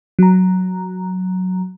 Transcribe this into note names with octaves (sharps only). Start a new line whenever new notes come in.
F#3 A#5